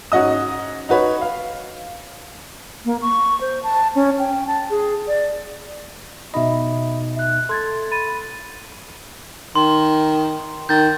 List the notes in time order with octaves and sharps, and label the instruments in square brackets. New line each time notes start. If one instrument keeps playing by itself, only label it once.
[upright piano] G#2 C#4 F#4 D#5 D#6
D#4 F#4 B4 C#5
F5
[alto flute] A#3
C#6
C5
A5
C#4
G5
A5
G#4
D5
[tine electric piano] B2 D#4 D#5 [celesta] E5 B5
[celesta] E5 F#6
[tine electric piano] A4 [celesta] C6 G#6 A6
[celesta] B5 A6 D#7
[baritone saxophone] D#3 [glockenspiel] C6
[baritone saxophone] D#3 [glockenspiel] G6 A6